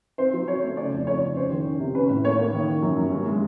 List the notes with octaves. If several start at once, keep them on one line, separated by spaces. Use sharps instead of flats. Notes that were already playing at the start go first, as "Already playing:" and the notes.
C4 C5
F#3
C4 C#5
A3
C#3 D5
F2
F2 C#5
F2
C#4 C5
D#3
C#4
C3
C#4 B4
A2
A#3 C#5
A#3
D#3
D#3
F#2
F#2
G2
G#3